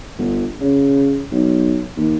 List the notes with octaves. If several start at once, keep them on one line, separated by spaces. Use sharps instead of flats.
G1
C#3
B1
D#2